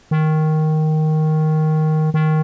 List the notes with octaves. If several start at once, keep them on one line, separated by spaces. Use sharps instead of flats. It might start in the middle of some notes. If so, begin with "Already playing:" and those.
D#3
D#3